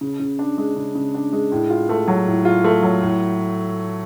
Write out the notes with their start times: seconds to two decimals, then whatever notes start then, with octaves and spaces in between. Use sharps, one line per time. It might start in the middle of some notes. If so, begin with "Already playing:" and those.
0.01 C#3
0.19 C#3
0.39 D4
0.58 G#3
0.76 C#3
0.95 C#3
1.14 D4
1.33 G#3
1.52 A2
1.70 F4
1.89 A3
2.08 F#3
2.26 A2
2.45 F4
2.64 A3
2.83 F#3
3.01 A2